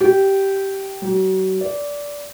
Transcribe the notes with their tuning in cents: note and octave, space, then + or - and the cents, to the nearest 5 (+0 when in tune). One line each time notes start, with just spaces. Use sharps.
G4 -10
F#3 +35
D5 -20